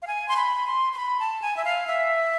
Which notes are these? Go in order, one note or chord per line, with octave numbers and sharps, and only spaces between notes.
F5
G#5
C6
B5
C6
C6
B5
A5
G#5
E5
F5
E5